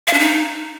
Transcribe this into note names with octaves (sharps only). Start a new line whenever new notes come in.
F5
D4
D#4